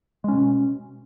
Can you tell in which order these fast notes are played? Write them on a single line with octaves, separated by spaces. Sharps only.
G#3 C#4 B2